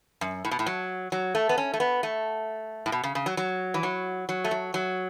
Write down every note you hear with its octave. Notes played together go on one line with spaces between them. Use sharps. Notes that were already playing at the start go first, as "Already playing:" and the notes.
F#2
A2
B2
A2
F#3
F#3
A3
B3
C#4
A3
B3
A3
A2
B2
C#3
C#3
F#3
F#3
E3
F#3
F#3
A3
F#3
F#3